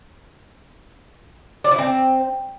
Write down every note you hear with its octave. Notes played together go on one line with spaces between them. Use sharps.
D5
E4
C4